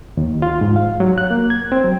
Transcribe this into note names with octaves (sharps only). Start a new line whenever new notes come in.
D#2
F4
G#2
F5
F#3
F#6
A#3
G#6
C4
F#3